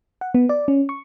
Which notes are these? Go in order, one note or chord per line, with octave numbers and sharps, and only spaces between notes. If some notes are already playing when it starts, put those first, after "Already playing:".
F#5
B3
D5
C#4
C#6